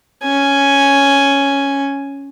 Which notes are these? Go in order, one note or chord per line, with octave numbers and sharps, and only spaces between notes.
C#4 G#5